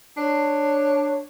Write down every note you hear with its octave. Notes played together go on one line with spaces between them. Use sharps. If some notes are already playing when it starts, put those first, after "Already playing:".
D4 C#5